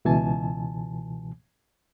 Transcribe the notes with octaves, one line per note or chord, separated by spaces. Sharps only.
C#2 B2 E3 G#5 A5